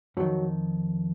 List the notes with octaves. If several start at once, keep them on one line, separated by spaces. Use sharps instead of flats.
F2 D#3 F#3